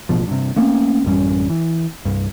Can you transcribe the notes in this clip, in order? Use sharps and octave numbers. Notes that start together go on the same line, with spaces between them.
A1 B2 F3
G2 C3
A3 A#3 C4 C#4
A1 F#2 G3 C#4
E3
C2 G2